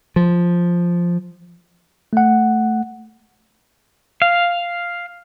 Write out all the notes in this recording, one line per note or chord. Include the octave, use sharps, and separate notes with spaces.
F3
A3 F#5
F5